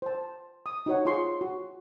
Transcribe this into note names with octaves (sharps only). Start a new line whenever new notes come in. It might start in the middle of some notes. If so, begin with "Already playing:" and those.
C5 A5
D#6
D#4 F#4 C#5 F#5
F4 G#4 C#5 C6 C#6
F#4